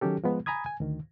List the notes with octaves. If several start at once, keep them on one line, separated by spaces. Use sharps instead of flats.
D#3 F#3 C#4 G4 A4
F3 G#3 B3
G#5 A#5 B5 D#6 G#6
G#5
D2 D#3